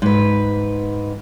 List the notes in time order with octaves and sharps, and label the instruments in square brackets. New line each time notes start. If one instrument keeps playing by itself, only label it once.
[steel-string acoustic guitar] G#2 B4